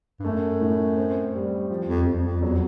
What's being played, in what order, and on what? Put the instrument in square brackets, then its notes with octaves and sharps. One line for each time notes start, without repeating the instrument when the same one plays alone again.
[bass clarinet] G2
[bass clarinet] F#2 [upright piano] A3
[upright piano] A2
C4
G3
F3
[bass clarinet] F2
[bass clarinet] F2 [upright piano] F3
[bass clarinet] F2
[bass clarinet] E2 [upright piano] F#3